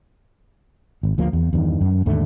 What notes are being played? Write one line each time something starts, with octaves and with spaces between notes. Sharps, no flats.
G#1
D2 F3 A#3
E2
E2 G2 D#3
F#2
D#2 G#2 D3 A3